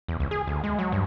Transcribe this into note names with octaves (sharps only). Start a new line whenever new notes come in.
E2
C#2
G#4
D2
G#3
F#3
G2